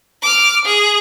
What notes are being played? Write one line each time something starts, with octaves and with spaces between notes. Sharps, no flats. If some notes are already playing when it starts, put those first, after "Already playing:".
D6 F6
G#4